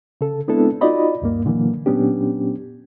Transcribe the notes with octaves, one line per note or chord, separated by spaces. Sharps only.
C#3 A4
G#3 B3 C4 D4 E4 A4
D#4 F4 F#4 D5 D#5 B5
D2 G2 A#3
A#2 D3 E3 F#3 A#3
A#2 F#3 B3 C#4 D4 G4